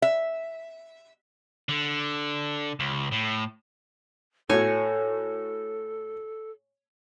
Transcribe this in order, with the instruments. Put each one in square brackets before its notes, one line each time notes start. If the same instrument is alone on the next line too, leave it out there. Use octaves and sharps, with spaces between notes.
[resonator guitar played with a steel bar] E5
[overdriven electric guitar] D3
C#2
A2
[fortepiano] A2 F#4 [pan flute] A4 [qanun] C#5 G#5